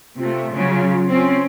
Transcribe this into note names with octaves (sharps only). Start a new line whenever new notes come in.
C3 A3 F4
C#3 F#3
C4 C#4